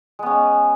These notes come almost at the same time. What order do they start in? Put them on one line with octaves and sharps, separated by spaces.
G#3 B3 C#4